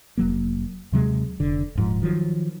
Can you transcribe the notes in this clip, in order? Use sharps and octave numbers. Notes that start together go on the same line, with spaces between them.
F1 F#3 A#3
D#2 C3 F#3 G#3
F1 D3
D#1 G#2 F3
D#3 F3 F#3